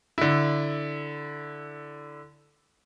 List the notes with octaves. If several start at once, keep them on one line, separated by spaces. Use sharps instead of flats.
D3 E4